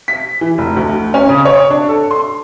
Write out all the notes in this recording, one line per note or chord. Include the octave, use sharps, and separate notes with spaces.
B6
E3
F1
D2
C#4
C#3
C#5
D4
A4
C6